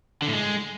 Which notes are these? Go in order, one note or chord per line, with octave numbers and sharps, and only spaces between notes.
D3
A2
G#3